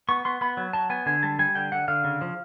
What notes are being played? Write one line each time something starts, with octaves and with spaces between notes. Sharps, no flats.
B3 C#6
B3 C6
B3 B5
F#3
F#3 A5
B3 G#5
D3 G#5
G3 A5
G3 G#5
D3 G5
D3 F#5
D3 F5
C#3
F3